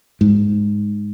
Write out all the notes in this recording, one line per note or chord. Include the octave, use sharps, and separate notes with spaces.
G#2